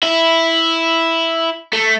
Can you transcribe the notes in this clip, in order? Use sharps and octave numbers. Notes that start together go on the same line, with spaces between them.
E4
A3